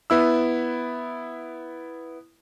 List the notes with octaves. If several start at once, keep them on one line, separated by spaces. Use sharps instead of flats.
B3 E4 E6